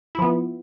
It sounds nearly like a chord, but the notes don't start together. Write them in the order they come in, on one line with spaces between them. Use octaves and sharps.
E4 F3 B3